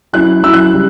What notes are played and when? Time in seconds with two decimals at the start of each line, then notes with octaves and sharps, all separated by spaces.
0.13 F#3 C#4 E4 F#6
0.43 F#3 C#4 E4 E6
0.53 F#6
0.73 C#3 G3